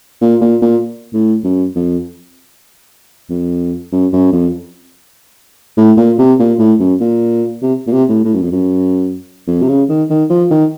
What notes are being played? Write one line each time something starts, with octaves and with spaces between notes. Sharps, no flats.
A#2
A#2
A#2
A2
F#2
F2
F2
F#2
F#2
F2
A2
A#2
C3
A#2
A2
F#2
A#2
C3
A#2
C3
A2
A2
F#2
F2
F#2
F2
C3
C#3
D#3
D#3
F3
D#3